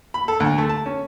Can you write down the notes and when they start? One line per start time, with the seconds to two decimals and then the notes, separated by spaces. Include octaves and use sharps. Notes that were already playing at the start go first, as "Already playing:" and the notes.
0.14 B5
0.28 A4
0.40 D2
0.58 A3
0.69 A5
0.86 C#4